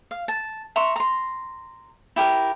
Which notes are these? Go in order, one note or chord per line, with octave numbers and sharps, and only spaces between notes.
F5
A5
E5 A#5 C6 C#6
A#5 C6
E4 G4 G#4 A#4